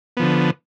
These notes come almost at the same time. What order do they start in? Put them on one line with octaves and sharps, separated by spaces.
B3 F3 D3